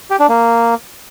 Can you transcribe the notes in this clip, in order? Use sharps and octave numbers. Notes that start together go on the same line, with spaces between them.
G4
D4
A#3